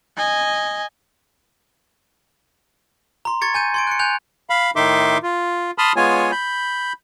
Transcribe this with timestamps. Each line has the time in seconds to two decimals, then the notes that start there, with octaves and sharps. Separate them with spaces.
0.17 D#5 G#5
3.25 A#5 C6
3.41 C#6 G#6 A6 C#7
3.54 G#5 G6 D#7
3.74 C6 G#6 D7
3.87 F#6 C#7
3.99 G#5 F#6 G6 F7
4.50 F5 B5
4.76 A2 D#3 D#4 E5 C6 D6
5.23 F4
5.78 A5 B5 C6 D#6 F6
5.96 G#3 B3 F4 C#5 G#5
6.32 B5 G6